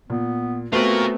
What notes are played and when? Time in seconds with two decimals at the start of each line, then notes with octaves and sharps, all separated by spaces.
0.10 A#2 B3
0.72 A3 B3 C4 F4 F#4 A#4